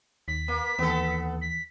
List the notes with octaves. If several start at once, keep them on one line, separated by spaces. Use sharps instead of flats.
D#2 B6
A#3
D#2 E3 B3 A4
B6